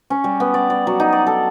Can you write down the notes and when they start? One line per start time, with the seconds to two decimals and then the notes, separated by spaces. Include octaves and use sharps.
0.10 C#4
0.24 G3
0.40 B3
0.54 D5
0.70 D5
0.87 F#3
1.00 D#4
1.13 D5
1.27 A4